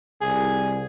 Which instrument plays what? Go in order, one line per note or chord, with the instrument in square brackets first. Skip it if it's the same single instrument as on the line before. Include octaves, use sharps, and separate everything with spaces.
[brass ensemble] C2 [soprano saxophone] G#4